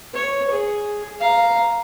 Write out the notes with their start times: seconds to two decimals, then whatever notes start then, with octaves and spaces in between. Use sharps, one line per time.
0.13 C#5
0.50 G#4
1.20 F5 A#5